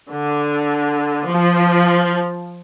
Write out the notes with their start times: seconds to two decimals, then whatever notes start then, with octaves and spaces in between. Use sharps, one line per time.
0.10 D3
1.29 F3